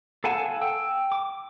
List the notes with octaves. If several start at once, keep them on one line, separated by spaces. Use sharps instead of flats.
A4 F5 F#5 G#5 A5
G5 E6
D6